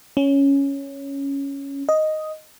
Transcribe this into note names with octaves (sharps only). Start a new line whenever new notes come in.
C#4
D#5